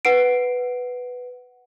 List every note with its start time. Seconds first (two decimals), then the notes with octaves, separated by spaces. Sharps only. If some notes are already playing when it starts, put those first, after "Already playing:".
0.05 B4 F#5 C7 D7